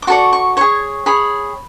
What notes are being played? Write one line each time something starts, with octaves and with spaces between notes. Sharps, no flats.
D6
F#4 A4 D5 C#6
C#6
G#4 C#5 C#6
G#4 C#5 B5